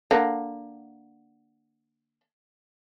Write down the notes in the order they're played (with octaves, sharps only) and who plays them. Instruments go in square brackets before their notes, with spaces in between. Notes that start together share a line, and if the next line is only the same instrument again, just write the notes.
[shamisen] D3 A#3